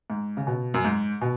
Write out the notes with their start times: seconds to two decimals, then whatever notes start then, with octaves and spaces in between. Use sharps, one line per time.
0.10 G#2
0.37 C#3
0.47 B2
0.74 F#2
0.84 G#2
1.21 B2